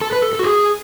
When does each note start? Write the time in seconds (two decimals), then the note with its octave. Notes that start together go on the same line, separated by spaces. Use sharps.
0.01 A4
0.12 B4
0.22 A4
0.33 A4
0.39 F#4
0.43 G#4